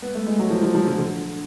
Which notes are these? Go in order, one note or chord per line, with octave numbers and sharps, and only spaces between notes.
B3
A3
G#3
F#3
F3
F3
F3
D3
D3